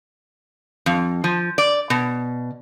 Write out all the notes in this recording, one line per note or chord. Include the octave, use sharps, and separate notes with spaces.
F2
F3
D5
B2